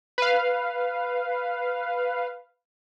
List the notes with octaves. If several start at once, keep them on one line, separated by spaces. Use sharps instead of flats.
B4 F5